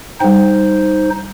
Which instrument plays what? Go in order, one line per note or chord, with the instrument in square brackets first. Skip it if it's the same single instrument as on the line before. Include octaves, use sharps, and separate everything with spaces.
[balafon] G3 G5 [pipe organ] D#4 C5